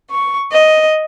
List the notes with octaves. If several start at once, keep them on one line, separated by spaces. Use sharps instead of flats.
C#6
D#5